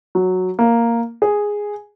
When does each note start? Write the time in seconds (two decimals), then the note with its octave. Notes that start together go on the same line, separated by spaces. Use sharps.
0.15 F#3
0.59 A#3
1.22 G#4